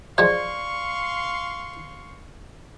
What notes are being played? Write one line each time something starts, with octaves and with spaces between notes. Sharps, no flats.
F3 G#3 G4 D5 F5 C6 C#6